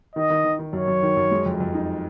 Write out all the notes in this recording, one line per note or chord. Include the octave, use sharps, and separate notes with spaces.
D#3 D#5
D#3
D#3
D#3
F#2 C#5
F#2
D#3
F#2
G#3
F2
F2
D#4